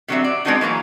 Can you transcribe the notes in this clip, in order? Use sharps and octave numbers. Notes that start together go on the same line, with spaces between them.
B2 D3 F#3 G3 C4 E5
D5
G#3 B3 C4 D4 D#4 F#4
E3 F#3 A#3 A#5